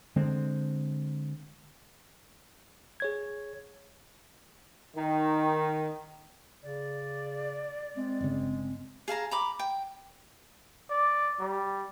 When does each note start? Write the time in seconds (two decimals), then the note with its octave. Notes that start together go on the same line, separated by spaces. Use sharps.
0.16 D3 G#3 C4
3.00 G#4 C#5 G#6
4.96 D#3
6.63 C#3 D5
7.96 G#3 C4
8.21 G1 C#3
9.08 G#4 F5 A5 A#5
9.31 A#5 B5 D6
9.59 G5
10.90 D5
11.40 G3